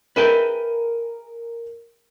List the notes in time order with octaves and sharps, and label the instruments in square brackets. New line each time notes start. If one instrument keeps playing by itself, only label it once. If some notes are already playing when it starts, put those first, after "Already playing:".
[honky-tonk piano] G#4 A#4 D#7 [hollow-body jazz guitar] B4 E5 G5